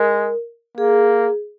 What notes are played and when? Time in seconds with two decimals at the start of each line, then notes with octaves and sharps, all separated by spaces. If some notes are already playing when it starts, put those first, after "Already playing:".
Already playing: G#3 A#4
0.77 A#3 G#4